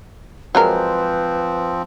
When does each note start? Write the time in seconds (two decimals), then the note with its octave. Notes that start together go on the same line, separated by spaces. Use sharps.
0.55 F3 F#3 G#3 C4 A#4 B4